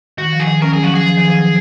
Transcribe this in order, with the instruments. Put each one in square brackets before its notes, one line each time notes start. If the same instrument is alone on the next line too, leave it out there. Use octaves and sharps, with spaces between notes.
[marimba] D#3 [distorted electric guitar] F#4
[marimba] F3
[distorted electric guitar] G#4
[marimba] D#3
[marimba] C#4 [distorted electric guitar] A#4
[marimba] F#3 [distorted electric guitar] G#4
[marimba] F3 [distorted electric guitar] F#4
[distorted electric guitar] G#4
[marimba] F3
D#3
F3
F#3